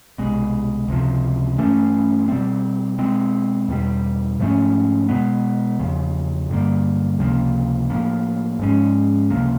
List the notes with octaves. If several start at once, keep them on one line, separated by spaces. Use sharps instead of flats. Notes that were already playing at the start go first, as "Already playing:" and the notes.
C2 B2 G#3
C#2 C3 F3
G2 E3 A3 C#4
B2 G3 C4
B2 G#3 C4
E2 B2 G3
G#2 F3 A3 C#4
B2 G#3 B3
E2 C#3 F3
G2 D3 G3 A#3
C#2 C3 F3 A#3
A2 F3 A#3
G#2 F3 G#3 C#4
C#2 C3 F3 A#3